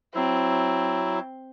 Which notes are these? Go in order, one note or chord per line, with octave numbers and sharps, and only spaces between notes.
F#3 C4 E4